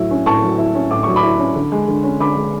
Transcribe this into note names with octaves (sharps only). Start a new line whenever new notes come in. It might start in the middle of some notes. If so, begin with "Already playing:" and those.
Already playing: A2 F#3 E4
C#4
A2 A5 C#6
F#3
E4
C#4
A2 D6
F#3 C#6
B5 D6
E4
C#4
D3
G#3
D3
C#4
D3 B5 D6
G#3